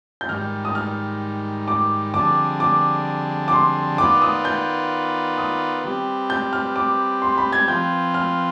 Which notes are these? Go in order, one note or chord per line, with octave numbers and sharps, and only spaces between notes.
G6
G#2 D#3 G3 F6
D#6
F6
D6
F2 D3 G3 D4 G#4 D6
D6
D6
C6
D#3 B3 F4 B4 D5 D6
D#6
G6
D#6
G3 C4 G4 B4
G6
F6
D6
C6
B5
G#6
F3 C4 F4 B4 G6
F6